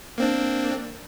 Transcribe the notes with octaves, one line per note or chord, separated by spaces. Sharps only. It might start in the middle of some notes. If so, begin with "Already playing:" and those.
A#3 C4 D4